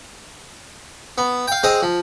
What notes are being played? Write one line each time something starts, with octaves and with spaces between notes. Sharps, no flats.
B3
F5 G5
G#3 C4 D#5 D#6
F3